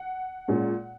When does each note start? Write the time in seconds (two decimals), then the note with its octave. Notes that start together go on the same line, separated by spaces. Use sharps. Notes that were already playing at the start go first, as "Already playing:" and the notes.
Already playing: F#5
0.48 A#2 G#3 C#4